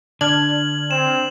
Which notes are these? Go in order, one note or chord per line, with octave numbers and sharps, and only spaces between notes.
D3 D4 F6 G#6 F#7
C4 E7